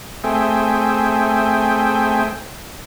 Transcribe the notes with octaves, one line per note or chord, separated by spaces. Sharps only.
A3 C4 G#4 E5 G5